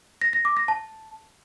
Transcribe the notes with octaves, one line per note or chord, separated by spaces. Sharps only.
A#6
A#6
D6
A#6
A5